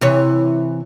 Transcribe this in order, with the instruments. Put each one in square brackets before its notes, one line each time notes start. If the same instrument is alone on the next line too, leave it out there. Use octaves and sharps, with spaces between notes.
[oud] C3 E3 C#5